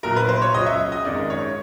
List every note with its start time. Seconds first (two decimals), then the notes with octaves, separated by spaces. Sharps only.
0.03 A#1 A#2 F#3 A#4
0.16 B4
0.29 C5
0.42 C#5
0.54 C#2 C#3 F#3 D#5
0.66 E5
0.92 D#5
1.05 G#1 F#2 D#3 G#3 D5
1.30 C#5